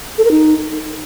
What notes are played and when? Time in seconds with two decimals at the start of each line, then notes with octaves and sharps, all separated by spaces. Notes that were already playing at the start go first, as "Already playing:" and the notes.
0.18 A4
0.25 A#4
0.31 D#4